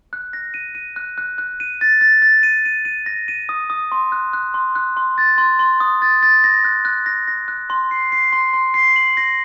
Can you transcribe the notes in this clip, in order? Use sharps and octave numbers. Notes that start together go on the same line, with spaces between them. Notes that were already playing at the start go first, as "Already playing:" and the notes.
F#6
A#6
D#7
D#7
F#6
F#6
F#6
D#7
A6
A6
A6
D#7
D#7
D#7
A#6
D#7
D#6
D#6
C6
F#6
F#6
C6
F#6
C6
A6
C6
C6
D#6
A6
A6
A#6
F#6
F#6
A#6
A#6
F#6
C6
C7
C7
C6
C6
C7
F#7
A#6